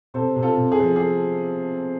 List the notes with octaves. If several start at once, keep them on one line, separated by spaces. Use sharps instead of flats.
C3 A4 C5
C3
F4 A4
C3
G#4
F3
G#4